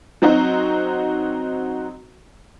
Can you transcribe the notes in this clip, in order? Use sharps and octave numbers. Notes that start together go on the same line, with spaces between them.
F#3 C4 D#4 F#4